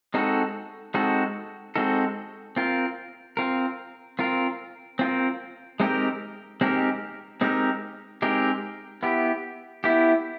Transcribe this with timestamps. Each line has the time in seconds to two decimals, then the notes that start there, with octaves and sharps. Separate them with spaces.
0.14 G#3 C4 D#4 F#4 A4
0.94 G#3 C4 D#4 F#4 A4
1.76 G#3 C4 D#4 F#4 A4
2.56 C4 F4 A#4
3.37 C4 F4 A#4
4.19 C4 F4 A#4
4.99 C4 F4 A#4
5.80 G#3 C4 D#4 G4 A#4
6.61 G#3 C4 D#4 G4 A#4
7.41 G#3 C4 D#4 G4 A#4
8.22 G#3 C4 D#4 G4 A#4
9.03 B3 E4 G4
9.84 B3 E4 G4